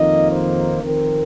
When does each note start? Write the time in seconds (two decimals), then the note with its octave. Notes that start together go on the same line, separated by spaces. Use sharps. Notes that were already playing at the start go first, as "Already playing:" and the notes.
Already playing: F2 D#3 A#3 D#4 D#5
0.31 C5
0.83 F2 D#3 C4 A#4